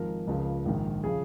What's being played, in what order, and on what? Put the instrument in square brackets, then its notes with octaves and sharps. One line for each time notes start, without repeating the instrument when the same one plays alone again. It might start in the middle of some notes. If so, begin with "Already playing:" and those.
Already playing: [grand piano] G#1 G#2 F3 A#4
C#2 C#3 F3
A#1 G#2 D#3
C#3 F3 G#4